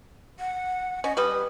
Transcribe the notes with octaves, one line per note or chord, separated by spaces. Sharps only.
F#5
C#4 D#5
G3 B4 D#6